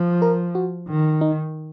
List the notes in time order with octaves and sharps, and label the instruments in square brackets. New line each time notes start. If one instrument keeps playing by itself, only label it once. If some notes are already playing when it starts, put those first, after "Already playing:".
Already playing: [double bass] F3
[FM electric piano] A#4
F#4
[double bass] D#3
[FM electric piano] D#4